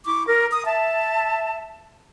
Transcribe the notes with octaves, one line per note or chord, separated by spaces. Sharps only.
E4 C#6 D6
A#4
D#6
E5 A5